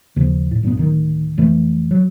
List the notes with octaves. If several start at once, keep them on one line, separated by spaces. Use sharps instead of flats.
D#2 C#3 F3
A2
B1 G2 A#2 B3
D1 D#3
F#1 F2 E3 A3
F#3